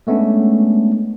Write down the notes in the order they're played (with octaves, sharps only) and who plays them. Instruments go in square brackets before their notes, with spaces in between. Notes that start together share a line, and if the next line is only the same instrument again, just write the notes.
[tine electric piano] G#3 A3 B3 C#4 D4